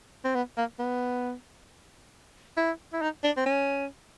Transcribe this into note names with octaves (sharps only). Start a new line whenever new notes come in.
C4
B3
A#3
B3
E4
E4
D#4
D4
C4
C#4